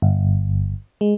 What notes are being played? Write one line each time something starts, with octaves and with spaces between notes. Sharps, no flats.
G1
G#3